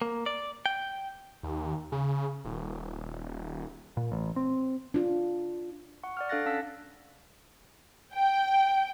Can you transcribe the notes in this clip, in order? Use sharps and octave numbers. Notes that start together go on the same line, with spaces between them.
A#3
D5
G5
D#2
C#3
D#1
D#1
A#2
A1
C4
D4 F4
F#5 C#6
D5 F#5 F6
D4 A4 F5 F#6 A6 A#6
C#4 F5 A5 E6 B6
G5